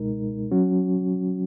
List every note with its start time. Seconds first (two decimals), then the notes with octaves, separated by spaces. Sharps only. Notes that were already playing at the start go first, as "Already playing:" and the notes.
Already playing: C#2 B2 G#3 D#4 A#4
0.52 F#3 C#4 F#4